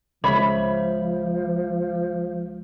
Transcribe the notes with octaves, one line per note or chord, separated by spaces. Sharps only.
C#2 F3 G#3 C#5 E5 B5